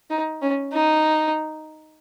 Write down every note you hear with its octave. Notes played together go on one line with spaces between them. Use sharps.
D#4
C#4
D#4